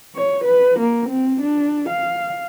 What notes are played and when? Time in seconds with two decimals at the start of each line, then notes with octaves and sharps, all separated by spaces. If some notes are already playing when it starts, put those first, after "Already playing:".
0.15 C#5
0.44 B4
0.80 A#3
1.09 C4
1.41 D4
1.89 F5